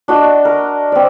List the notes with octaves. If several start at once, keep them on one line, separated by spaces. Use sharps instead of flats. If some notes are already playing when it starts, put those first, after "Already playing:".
D4 F#4 D#5
A#4
C4 D5